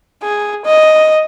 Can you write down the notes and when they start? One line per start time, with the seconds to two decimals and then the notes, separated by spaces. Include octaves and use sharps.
0.23 G#4
0.65 D#5